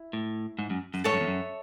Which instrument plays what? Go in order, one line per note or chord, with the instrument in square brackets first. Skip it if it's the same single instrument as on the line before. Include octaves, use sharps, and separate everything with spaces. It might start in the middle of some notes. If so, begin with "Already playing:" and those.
Already playing: [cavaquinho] E4
[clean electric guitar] A2
G#2
F#2
F#2
[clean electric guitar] G#2 [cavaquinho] A4 C#5 E5 A5
[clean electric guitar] F#2
E2
F#2